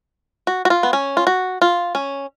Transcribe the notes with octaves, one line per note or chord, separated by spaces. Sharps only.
F#4
F#4
F4
B3
C#4
F4
F#4
F4
C#4